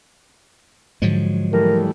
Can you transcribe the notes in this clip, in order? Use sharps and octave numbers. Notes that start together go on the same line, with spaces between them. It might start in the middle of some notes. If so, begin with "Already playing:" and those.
G#2 D3 F3 F#3 G#3
E3 G3 A3 A#4